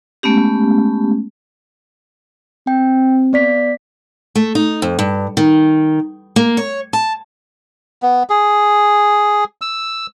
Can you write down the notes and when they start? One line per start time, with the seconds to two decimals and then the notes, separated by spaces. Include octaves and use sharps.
0.23 G#3 A3 B3 C#4 G4
2.67 C4 G5
3.33 B3 D5 B6
4.35 A3
4.55 D#4
4.82 F2
4.99 G2
5.37 D#3
6.36 A#3
6.57 C#5
6.93 A5
8.03 B3
8.30 G#4
9.62 E6